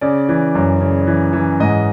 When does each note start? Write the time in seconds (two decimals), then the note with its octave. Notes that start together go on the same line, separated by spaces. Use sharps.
0.01 C#3 D5
0.29 E3
0.55 F#2
0.81 C#3
1.07 E3
1.33 E3
1.60 G#2 D#5